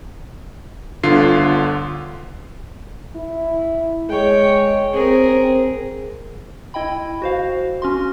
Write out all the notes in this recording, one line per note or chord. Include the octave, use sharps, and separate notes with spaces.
G1 D3 F4 C7
E4
G#3 C#5 G5
C4 G#4 A#4
C4
E4 D#5 G5 B5
F#4 C5 F5
C#4 F#4 C6